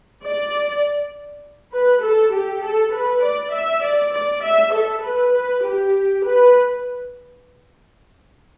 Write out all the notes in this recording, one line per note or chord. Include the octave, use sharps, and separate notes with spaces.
D5
B4
A4
G4
A4
B4
D5
E5
D5
D5
E5
A4
B4
B4
G4
B4